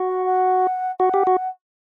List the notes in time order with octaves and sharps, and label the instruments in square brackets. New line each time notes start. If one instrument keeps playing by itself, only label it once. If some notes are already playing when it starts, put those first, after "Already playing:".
Already playing: [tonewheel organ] F#4
[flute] F#5
F#5
[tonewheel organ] F#4 [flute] F#5
[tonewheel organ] G4
F#4